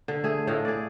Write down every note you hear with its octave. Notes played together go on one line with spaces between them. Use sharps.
D3
A3 G#4
A2 A3 D#5 F5
G#4 D5